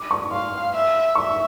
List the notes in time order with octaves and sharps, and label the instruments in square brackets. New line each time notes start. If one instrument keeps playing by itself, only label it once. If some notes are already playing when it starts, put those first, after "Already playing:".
Already playing: [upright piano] D6
C#6
[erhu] F5 [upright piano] C6
[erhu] E5
[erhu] E5 [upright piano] C#6